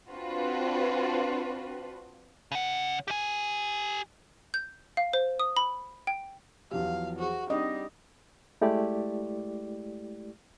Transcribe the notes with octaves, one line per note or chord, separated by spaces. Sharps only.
C4 D4 F4 F#4 B4
C#3 F#5
G4 G#5
G6
F5
C5
D#6
B5
G5
E2 F3 F#3 G4 F5
F#4 G#4 C5
G3 C4 D4 D#4 D#5
G#3 A3 E4 G4 D5